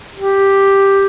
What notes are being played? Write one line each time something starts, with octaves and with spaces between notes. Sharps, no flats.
G4